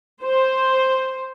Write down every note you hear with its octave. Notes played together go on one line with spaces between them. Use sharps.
C5